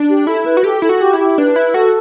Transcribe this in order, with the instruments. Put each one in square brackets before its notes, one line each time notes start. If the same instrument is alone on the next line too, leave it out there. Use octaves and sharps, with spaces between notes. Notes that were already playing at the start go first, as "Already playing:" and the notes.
Already playing: [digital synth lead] D4
[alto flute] G4
[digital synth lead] E4 [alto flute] A4
[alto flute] B4
[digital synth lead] F#4
[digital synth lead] G4 [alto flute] A4
[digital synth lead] E4 [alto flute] A4
[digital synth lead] F#4
[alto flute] G4
[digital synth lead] E4
[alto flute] G4
[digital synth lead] D4 [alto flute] B4
[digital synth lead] E4
[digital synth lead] F#4 [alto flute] A4